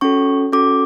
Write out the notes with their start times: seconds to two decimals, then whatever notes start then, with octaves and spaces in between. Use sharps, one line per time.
0.01 C#4 F#4 A4 C#6
0.52 C#4 F#4 A4 D6